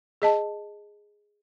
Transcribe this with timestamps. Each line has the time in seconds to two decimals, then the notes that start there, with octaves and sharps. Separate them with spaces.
0.22 G#4 D#5 A5